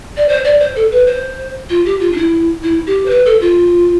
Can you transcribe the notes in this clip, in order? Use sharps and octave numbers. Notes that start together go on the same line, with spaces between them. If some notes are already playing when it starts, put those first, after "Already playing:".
D5
C5
D5
C5
A4
B4
C5
F4
G4
F4
D4
E4
E4
G4
C5
B4
A4
F4